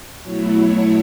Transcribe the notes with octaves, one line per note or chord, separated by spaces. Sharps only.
B2 F#3 A3 E4 C#5
C#5